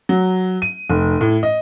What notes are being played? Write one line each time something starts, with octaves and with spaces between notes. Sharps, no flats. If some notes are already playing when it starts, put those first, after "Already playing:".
F#3
D#7
F1
A2
D#5